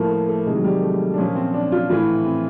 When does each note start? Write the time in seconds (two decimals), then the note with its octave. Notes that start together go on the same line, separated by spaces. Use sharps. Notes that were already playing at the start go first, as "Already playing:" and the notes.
Already playing: A2 F3 A3 A#3
0.11 A3
0.29 A3
0.46 C3 D#3 G#3
0.55 F#3
0.64 G3
0.83 A3
1.14 D4
1.18 A#2 F3 C#4
1.36 C4
1.54 D4
1.72 F4
1.89 A2 E3 F4
2.25 C4